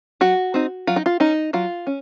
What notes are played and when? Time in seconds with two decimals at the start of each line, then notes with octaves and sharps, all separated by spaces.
0.21 F#3 F#4
0.54 C4 D#4
0.87 F#3 F4
0.96 D#4
1.06 F4
1.20 C#4 D#4
1.53 F#3 F4
1.87 C#4